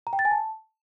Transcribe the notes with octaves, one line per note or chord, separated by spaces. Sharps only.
A#5
G5
A6
G#5
A5